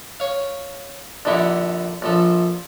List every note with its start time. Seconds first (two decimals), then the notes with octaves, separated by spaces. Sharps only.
0.20 C#5 F5
1.25 A#1 D3 D#4 E4 G4 F#5
2.02 A#1 F3 A4